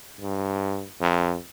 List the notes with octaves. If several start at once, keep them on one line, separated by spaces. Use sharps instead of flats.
G2
F2